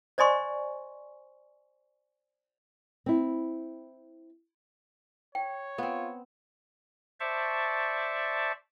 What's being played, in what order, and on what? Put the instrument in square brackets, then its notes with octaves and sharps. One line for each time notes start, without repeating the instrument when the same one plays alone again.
[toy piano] C5 D5 D#5 G#5 C6 C#6
[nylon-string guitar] C4 E4
[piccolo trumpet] C#5 [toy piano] G5
[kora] B3 C4 [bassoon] F4
[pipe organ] C5 D5 E5 A5 C#6